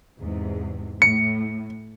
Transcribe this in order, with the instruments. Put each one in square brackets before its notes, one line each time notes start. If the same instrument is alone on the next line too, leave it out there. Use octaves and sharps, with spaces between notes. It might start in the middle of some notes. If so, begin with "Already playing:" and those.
[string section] E2 G#2 C3
[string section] A2 [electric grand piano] C#7